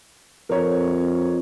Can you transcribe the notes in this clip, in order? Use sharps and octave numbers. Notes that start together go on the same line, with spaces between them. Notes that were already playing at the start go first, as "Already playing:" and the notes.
F2 A#4 C#5